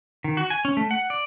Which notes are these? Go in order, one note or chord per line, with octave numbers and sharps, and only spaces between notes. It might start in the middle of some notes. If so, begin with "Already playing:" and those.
D#3
F#4
G#5
C#4
A3
F#5
D5